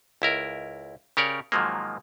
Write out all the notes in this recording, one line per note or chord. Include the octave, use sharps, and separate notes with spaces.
C#2 E4 A#4
C#3 G4 A#4 C#5 D5
G#2 D#3 F3 F#3 G#3 A#3